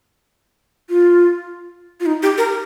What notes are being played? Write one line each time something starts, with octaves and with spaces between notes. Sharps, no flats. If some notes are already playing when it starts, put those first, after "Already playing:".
F4
F4
D#4
G4
A#4